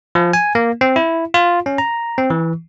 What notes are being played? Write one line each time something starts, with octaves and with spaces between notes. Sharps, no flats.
F3
G#5
A#3
C4
E4
F4
C#4
A#5
C4
E3